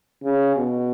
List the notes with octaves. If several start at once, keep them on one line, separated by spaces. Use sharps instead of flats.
C#3
B2